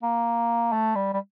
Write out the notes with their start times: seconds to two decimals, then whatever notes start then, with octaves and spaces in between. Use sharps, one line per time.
0.03 A#3
0.73 A3
0.95 G3
1.14 G3